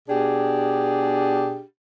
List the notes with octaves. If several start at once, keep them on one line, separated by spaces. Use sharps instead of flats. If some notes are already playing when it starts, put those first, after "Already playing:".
B2 D4 G4 G#4